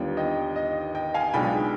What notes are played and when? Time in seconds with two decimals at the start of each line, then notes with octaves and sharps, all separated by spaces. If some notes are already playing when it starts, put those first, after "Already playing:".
Already playing: D#2 D3 G3 B3 F4 G5
0.17 D#5 G5
0.56 D#5
0.95 D#5 G5
1.14 F5 G#5
1.33 B1 B2 G#3 D4 F4 G5 B5